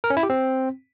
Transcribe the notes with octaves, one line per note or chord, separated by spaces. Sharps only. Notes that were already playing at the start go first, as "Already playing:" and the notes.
A#4
C#4
E4
G4
C4